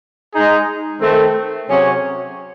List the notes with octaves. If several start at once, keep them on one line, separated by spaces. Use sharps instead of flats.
G#3 D#4 G#4
D#3 A3 C4
C3 F#3 C#4 G#4 C#5